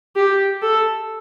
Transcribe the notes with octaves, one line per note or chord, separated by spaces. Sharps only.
G4
A4